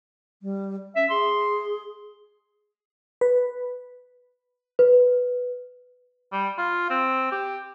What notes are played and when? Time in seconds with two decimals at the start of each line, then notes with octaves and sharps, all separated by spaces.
0.42 G3
0.96 C#4 E5
1.10 G#4 C6
3.21 B4
4.79 B4
6.33 G3
6.58 F4
6.90 C4
7.32 G4